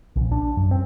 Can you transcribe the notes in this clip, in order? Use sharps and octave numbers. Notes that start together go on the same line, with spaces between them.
A#1
D4
F#2
C4